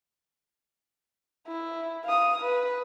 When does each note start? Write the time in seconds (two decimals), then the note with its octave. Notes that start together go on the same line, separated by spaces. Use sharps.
1.48 E4
2.04 F5 D#6
2.41 B4